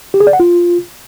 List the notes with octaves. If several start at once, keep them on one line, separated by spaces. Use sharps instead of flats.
G4
G#4
D5
F#5
F4